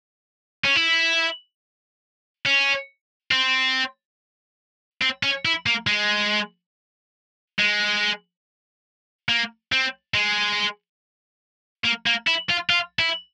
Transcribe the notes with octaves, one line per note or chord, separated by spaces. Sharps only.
C#4
E4
C#4
C4
C4
C#4
E4
A#3
G#3
G#3
A#3
C4
G#3
A#3
A#3
E4
F4
F4
E4